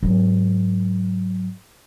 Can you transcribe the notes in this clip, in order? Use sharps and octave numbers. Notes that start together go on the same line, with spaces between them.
G#2 F#3